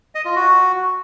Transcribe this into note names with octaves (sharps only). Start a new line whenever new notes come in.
D#5
F4
F#4